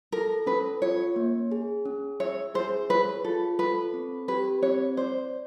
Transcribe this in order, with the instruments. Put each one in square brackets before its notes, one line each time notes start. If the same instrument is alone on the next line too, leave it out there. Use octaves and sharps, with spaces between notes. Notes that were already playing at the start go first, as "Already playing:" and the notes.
[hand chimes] A4 [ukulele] A#4
[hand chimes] C#4 [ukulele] B4
[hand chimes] F4 [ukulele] C#5
[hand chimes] A#3
G#4
C#4
[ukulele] C#5 [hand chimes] E5
[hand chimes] G#4 [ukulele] C5
[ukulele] B4 [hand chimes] C#5
[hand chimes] F4 [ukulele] A4
[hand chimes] A4 [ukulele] B4
[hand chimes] C4
[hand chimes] G4 [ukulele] B4
[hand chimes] C4 [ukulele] C#5
[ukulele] C5 [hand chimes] D5